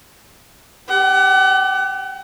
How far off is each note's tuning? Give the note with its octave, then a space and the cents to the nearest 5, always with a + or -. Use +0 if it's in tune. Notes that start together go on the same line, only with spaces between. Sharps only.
G4 +0 F#5 +35